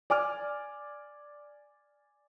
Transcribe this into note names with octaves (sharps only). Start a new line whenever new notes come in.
D5 G#5 D6 F6